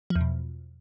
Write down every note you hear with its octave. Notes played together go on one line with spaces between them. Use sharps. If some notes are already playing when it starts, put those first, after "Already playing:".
F3
E2
B2